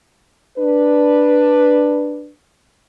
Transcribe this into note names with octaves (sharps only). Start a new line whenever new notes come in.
D4 B4